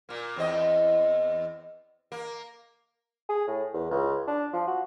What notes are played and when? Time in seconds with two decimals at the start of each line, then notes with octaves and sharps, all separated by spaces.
0.09 A#2 A#3
0.36 E2 C4 D#5
2.12 A#3
3.29 G#4
3.47 A2
3.73 E2
3.91 C#2
4.27 D4
4.53 F3
4.67 F#4